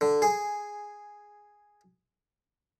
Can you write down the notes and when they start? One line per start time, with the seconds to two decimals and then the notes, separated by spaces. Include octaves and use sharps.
0.01 D3
0.22 G#4